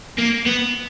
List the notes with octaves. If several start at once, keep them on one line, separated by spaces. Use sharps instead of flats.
A#3
B3